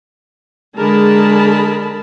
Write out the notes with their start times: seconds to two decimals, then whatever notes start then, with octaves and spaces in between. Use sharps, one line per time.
0.78 D3 G#3 G#4 A#4 A5 B5